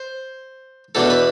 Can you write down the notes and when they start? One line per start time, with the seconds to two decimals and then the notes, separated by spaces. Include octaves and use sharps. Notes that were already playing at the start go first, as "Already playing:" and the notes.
Already playing: C5
0.95 E2 B2 B3 D4 A4
1.10 B4